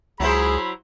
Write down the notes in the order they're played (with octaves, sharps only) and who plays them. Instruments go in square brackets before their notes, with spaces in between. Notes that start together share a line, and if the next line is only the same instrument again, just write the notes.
[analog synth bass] C#2 [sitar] F#3 E4 C5 [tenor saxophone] G#4 [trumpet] B5